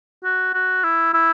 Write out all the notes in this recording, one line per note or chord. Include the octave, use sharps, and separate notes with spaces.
F#4
F#4
E4
E4